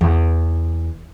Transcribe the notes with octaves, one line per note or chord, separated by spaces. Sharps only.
E2